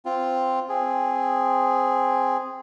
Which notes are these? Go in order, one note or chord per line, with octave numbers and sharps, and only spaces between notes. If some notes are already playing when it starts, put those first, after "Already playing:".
C4 F4
C4 G#4